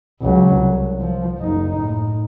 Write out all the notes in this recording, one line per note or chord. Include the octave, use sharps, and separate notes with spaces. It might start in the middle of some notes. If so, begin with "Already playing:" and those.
C#2 F#3
C2
F3
F#1 D#4
A2